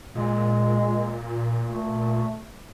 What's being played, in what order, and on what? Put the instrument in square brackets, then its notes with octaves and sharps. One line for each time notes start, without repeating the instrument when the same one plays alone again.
[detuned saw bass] A#2 [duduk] G#3
[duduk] A3